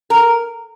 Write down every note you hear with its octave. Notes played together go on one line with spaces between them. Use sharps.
A#4